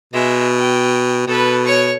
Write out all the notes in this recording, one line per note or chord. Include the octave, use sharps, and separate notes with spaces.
B2 G#3 E5
G5
B2 A4 B4
C#5 C#6